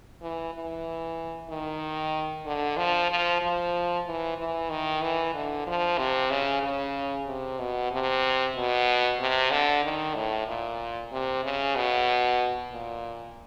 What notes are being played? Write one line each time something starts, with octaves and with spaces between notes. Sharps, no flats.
E3
E3
D#3
D3
F3
F3
F3
E3
E3
D#3
E3
D3
F3
C3
C#3
C#3
C3
B2
C3
B2
C3
D3
D#3
A2
A#2
C3
C#3
B2
A#2